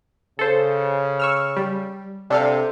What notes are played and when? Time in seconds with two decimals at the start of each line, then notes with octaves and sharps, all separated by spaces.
0.39 C#3 A4 C5
1.20 C#6 E6 F6
1.56 G3
2.30 C3 D4 A4 F5